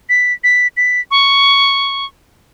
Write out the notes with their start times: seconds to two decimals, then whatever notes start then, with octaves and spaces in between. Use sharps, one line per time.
0.09 B6
0.44 B6
0.77 B6
1.11 C#6